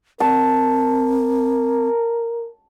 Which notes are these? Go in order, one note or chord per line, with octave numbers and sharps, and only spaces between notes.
C4 A#4 A5